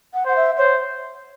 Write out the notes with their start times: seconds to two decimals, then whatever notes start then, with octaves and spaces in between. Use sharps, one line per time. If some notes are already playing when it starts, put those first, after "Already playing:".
0.14 F#5
0.25 C5 F#5
0.36 E5
0.58 C5 C#5